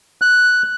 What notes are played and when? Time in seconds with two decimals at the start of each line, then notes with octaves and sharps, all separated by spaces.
0.22 F#6